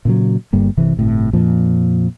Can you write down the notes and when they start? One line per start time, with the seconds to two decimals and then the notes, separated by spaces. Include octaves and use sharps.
0.05 A#2 C#3 F#3
0.53 G1 G2 G3 A#3
0.77 G1 C3 E3
0.97 G1 A2 C3
1.33 F2 A#2 F3